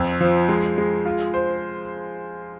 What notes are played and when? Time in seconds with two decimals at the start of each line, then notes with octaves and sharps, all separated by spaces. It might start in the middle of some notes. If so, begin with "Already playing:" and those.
Already playing: F2
0.21 F3
0.49 G#3
0.78 G#3
1.06 F4
1.34 C5